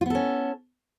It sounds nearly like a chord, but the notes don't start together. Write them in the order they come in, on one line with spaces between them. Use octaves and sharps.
F4 B3 A4 C#4